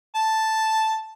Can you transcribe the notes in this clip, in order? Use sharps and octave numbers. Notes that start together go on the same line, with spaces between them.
A5